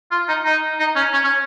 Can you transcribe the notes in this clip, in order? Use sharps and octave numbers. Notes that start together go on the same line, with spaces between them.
F4
D#4
D#4
D#4
C#4
C#4
C#4